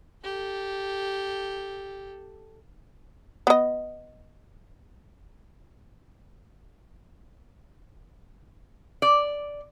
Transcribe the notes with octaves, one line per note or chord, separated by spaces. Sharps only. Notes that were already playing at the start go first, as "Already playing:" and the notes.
G4 A4
B3 D#5
D5